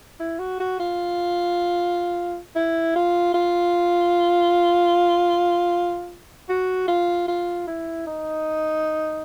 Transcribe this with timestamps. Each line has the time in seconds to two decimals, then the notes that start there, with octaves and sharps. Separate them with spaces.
0.20 E4
0.39 F#4
0.60 F#4
0.79 F4
2.55 E4
2.96 F4
3.34 F4
6.49 F#4
6.88 F4
7.28 F4
7.67 E4
8.07 D#4